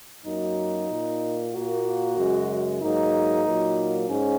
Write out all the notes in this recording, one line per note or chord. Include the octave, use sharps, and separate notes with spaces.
F#2 F#3 A#3 D#4
A#2 A#3
A#2 A#3 F#4
F#2 C#3 G#3
G#2 F#3 A#3 D#4
A#2 F#3 A#3
G#2 C#4